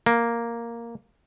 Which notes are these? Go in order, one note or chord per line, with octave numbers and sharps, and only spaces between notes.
A#3